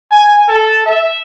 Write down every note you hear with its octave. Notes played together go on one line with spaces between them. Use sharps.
G#5
A4
E5